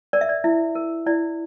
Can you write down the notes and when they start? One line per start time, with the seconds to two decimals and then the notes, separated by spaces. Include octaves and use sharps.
0.13 A#4 D5
0.21 E5
0.29 D5
0.44 E4 E5
0.75 A#4
1.06 E4 D5